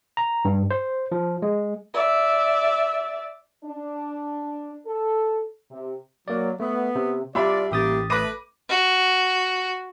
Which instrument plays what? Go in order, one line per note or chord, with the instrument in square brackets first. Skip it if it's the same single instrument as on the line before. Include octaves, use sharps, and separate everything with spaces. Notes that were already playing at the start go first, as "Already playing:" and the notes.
[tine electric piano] A#5
G2
C5
F3
G#3
[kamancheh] D5 E5
[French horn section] D4
A4
C3
[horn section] F#3 [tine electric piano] A#3 D5
[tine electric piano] A3 [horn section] B3
[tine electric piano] C3
[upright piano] C2 E5 B5 [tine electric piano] F4 [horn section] D5
[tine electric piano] A1 D#6 A6 [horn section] A#3 G4
[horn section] A3 B4 [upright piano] D6 A#6 D#7
[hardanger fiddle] F#4